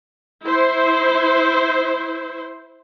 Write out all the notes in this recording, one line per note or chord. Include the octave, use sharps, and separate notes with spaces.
E4 C5